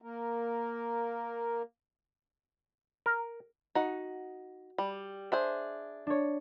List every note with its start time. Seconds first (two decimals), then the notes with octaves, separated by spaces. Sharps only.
0.02 A#3 A#4
3.06 A#4
3.75 D#4 F#4 F#5
4.78 G3
5.32 D4 G#4 C5 E5
6.07 D4 C#5